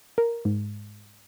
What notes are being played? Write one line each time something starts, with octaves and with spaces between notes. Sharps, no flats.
A#4
G#2